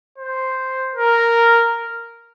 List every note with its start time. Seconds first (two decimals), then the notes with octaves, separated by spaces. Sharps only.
0.19 C5
0.96 A#4